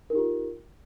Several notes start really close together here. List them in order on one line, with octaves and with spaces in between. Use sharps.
A#4 D#4 G4 F4